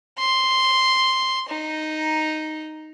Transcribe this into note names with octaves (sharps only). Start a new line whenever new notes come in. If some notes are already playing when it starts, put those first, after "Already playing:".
C6
D#4